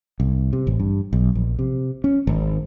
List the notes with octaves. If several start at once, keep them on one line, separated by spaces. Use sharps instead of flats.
C2
C3
A1
G2
B1
A#1
C3
C#4
G#1